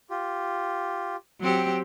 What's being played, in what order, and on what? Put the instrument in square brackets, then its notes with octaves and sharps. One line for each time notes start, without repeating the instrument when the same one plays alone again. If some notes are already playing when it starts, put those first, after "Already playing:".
[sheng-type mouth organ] F4 G4
[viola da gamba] F#3 C4 G4